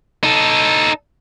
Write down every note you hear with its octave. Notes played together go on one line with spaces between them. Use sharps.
D#4 A4